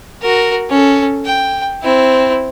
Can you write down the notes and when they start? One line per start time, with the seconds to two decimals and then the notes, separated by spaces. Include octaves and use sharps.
0.22 F#4 A#4
0.69 C#4 A4
1.26 G5
1.83 C4 E4